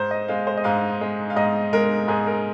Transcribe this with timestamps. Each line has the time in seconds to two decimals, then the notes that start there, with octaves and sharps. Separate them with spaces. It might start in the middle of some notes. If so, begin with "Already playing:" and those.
Already playing: G#2 C5
0.11 D#5
0.28 G#3 F5
0.47 C5
0.57 D#5
0.64 G#2 F5
1.01 G#3
1.30 F5
1.36 G#2 D#5
1.73 G#3 A#4
2.08 G#2 G#4
2.27 A#4